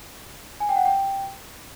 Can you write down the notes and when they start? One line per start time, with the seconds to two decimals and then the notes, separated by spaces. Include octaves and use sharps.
0.60 G#5
0.69 G5
0.76 F#5
0.85 G5